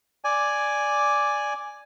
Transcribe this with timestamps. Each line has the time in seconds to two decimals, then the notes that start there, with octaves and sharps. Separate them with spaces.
0.24 D5 G#5